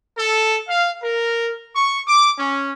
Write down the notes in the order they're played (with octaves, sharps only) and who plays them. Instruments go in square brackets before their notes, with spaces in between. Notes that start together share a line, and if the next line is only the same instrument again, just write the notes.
[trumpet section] A4
F5
A#4
C#6
D6
C#4